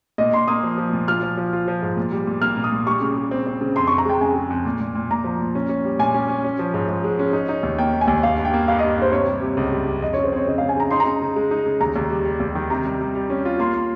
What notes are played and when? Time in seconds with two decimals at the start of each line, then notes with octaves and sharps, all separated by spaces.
0.18 A#2 D#5
0.33 A#2 C6
0.48 A#3 D#6
0.63 F3
0.78 F3
0.93 A#2
1.08 F4 F6
1.23 F3
1.37 F3
1.53 F4
1.68 F3
1.82 G#2
1.97 A#2
2.12 G3
2.27 A#2
2.41 A#3 F6
2.57 A#2
2.64 D#6
2.72 A#2
2.86 G3 C#6
3.01 C#3
3.16 C#3
3.31 C4
3.47 C4
3.61 C#3
3.76 F2 C6
3.87 F2 C#6
3.98 A#5
4.05 G#3 G5
4.21 C#3 G#5
4.35 G#3
4.50 F2
4.65 A#2
4.80 A#2
4.95 A#2
5.10 A#2 A#5
5.24 F3
5.40 A#2
5.55 C#4
5.69 C#4
5.85 G3
5.99 A#2 G#5
6.14 C#4
6.29 C#4
6.44 C#4
6.59 F3
6.74 G#2
6.89 G#2
7.04 G#3
7.19 C#4
7.33 D#4
7.49 D#4
7.63 D#2
7.79 A#3 G5
7.93 A#3
8.01 G#5
8.08 D#2
8.23 G2 F5
8.38 G2
8.45 G5
8.53 A#3
8.68 G2 F5
8.79 G2 D#5
8.97 G2 C5
9.12 C3 C#5
9.27 G3
9.42 C3
9.57 C#2
9.72 G3
9.87 C3
10.02 F2 D#5
10.13 C#3 C#5
10.24 C5
10.32 C4 C#5
10.47 C#3 D#5
10.58 C#3 F5
10.69 G#5
10.76 C#3 A#5
10.91 D#4 C6
11.00 A#5
11.06 C#3
11.21 C#3
11.36 G#3
11.51 D#4
11.66 C#3
11.81 D#2 A#5
11.96 D#2
12.10 G3
12.25 G3
12.40 D#2
12.55 D#3
12.70 C3 A#5
12.85 G3
13.01 G3
13.15 G3
13.30 C#4
13.45 F4
13.59 A#3 C6
13.74 A#3